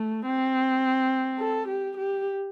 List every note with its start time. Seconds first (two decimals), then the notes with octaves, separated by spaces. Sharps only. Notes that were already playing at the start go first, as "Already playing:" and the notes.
Already playing: A3
0.26 C4
1.39 A4
1.68 G4
1.97 G4